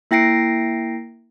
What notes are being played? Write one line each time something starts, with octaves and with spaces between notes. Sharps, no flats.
A#3 E4 G5 A#6 C7 D7